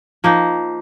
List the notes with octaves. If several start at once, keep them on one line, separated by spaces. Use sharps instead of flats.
F3 A#3 D#4